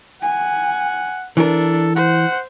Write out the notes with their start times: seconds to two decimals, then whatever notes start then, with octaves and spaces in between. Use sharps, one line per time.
0.22 F#5 G#5
1.37 E3 D4 A4 A#4
1.96 C5 F#5